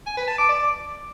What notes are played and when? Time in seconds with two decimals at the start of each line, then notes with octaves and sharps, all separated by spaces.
0.07 G#5
0.17 B4
0.28 A5
0.38 D6
0.49 D5